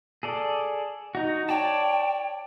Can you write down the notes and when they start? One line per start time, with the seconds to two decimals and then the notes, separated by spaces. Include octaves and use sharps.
0.23 G#4 A4 D5
1.15 D#4 F#4
1.49 C#5 D5 G5 A5